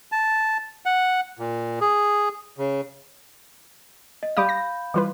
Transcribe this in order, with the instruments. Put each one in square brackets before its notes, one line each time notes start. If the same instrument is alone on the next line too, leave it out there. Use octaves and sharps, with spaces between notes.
[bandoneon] A5
F#5
A#2
G#4
C#3
[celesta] D#5
[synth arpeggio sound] G3 D6 D#6 [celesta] F5 B5 G6
[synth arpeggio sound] A#6
[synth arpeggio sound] E3 F4 B4 [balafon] G3